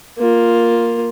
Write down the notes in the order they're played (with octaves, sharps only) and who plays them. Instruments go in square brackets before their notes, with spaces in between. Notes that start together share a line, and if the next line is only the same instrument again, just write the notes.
[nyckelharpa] A#3 F4